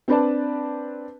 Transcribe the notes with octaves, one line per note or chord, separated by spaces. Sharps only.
C4 D4 B4 D5 A5